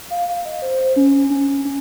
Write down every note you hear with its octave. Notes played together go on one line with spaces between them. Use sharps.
F5
F5
D#5
C5
C#4
C#4
C#4